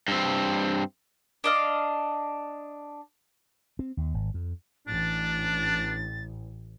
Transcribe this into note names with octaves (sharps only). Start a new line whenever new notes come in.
G2 C4
D4 D#5 F5
C4
D#2
G#1
F2
A1 D4 A6